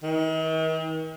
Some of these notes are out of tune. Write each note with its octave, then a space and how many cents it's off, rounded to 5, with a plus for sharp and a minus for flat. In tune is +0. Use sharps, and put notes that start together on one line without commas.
D#3 +40